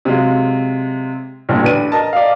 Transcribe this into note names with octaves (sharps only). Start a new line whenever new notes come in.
C3 F#3 G#3 F4
A1 G2 A#2 D3
A1 D4 B4 D#7
A#4 D#5 A5
D5 D#5 F5